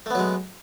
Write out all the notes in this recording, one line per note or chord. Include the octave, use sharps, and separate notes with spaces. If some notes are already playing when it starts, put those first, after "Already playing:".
F#3 G#3 A3 B3